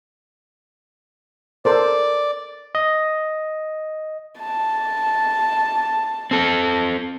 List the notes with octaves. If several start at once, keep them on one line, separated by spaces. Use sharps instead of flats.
A4 A#4 C5 D5
D#5
A5
C4 A4